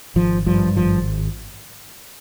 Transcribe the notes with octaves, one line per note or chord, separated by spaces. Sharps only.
G#1 F3
G2 F3
G#1 F3